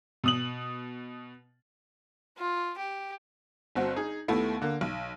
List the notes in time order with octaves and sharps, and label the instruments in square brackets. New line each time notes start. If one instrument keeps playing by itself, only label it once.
[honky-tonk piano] B2 D#6 F#7
[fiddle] F4
G4
[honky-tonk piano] G1 C4 F#4
D#4 G#4
D#2 A3 B3 E4
D3 A#3
B1